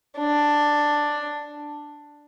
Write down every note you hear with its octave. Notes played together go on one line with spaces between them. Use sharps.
D4